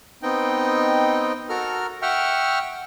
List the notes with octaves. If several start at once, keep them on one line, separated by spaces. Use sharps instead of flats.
B3 C4 D#4 D#5 G5
F#4 A4 A#4 A#5 F6
E5 F#5 G5 C#6 F6